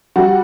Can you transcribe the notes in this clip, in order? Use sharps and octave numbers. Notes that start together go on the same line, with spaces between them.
G3 F#4